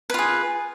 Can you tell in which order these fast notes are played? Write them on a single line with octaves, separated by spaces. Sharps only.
B4 F4 G#4